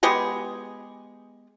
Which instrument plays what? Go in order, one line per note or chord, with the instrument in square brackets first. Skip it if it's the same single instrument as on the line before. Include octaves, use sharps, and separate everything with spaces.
[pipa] G#3 B3 G4 G#4